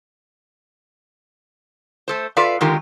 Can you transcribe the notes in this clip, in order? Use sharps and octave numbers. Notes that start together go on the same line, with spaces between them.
A3 A4 C5
F4 A4 B4 D5 E5 F5
D3 D#3 G#3 F4 G4 A#4